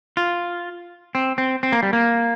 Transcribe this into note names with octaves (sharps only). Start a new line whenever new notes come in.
F4
C4
C4
C4
A#3
G3
A#3